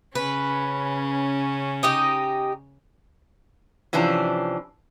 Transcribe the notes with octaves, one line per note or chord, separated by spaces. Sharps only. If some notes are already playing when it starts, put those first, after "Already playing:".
C#3 C#4 B4
D#4 G4 D#5
C3 E3 F3 C#4 D4